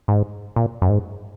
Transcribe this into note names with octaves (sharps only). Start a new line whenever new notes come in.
G#2
A#2
F#2
G#2